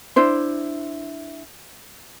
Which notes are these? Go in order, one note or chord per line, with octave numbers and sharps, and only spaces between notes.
D4 E4 C5